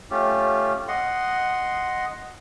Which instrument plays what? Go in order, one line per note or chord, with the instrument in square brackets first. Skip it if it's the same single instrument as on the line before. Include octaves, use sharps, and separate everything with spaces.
[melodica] A3 C#4 F4 G4
D#5 F#5 C6